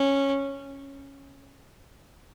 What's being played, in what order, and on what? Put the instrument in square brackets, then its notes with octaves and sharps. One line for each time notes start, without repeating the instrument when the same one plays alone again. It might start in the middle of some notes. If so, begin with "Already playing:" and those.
Already playing: [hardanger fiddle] C#4